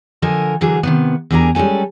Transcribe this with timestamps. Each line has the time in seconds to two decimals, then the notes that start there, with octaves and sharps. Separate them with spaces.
0.22 D3 F3 A4 A#4 D#5 G#5
0.61 D3 E3 F#3 A3 G#4 A#4
0.83 C3 D#3 B3
1.31 E2 G3 D4 A#4 G#5 A#5
1.55 G3 G#3 C#4 A4 G#5